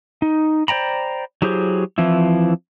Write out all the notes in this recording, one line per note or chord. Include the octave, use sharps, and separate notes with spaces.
D#4
C5 D5 G5 A#5 B5
F#3 E4 G4 G#4 C5
E3 F3 C4 E4